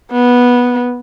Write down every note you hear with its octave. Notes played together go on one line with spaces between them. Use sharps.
B3